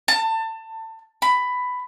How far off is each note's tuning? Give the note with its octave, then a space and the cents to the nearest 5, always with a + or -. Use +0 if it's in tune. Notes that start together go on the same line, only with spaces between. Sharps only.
A5 +25
B5 +10